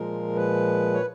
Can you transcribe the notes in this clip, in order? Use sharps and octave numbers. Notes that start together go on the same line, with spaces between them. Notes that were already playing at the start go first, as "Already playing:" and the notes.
Already playing: A#2 F3 G#3 A#4
B4
C#5